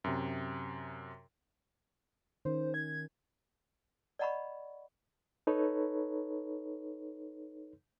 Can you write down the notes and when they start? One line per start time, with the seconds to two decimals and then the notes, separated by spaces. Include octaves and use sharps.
0.04 F#2 C3
2.45 D#3 C#4 C5
2.74 G#6
4.19 D5 D#5 F#5 A#5 B5 C#6
5.47 D#4 A4 B4 C#5